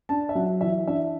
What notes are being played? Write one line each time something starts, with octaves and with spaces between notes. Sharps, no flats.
D4 A5
E5
F#3 F#5
E3 E5
D4 E5